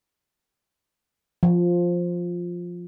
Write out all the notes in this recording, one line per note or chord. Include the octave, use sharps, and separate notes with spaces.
F3